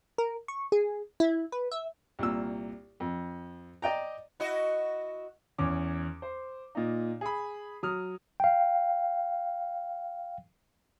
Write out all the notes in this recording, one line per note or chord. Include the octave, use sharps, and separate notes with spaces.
A#4
C#6
G#4
E4
B4
E5
C2 A#2 E6
F2
D5 D#5 G5 A#5
E4 F#4 D#5
E2 C#4 D6
C5
A#2 D#4
G#4 B5
F#3 D#6 F6
F5 G5